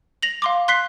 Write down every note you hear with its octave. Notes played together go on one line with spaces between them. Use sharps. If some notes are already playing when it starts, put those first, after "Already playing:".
A#6 F7 F#7
F5 C6 D6
C6 F#6 B6 C7 G7